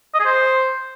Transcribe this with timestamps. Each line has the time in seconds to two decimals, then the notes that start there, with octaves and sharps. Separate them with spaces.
0.14 D#5
0.20 G#4
0.25 C5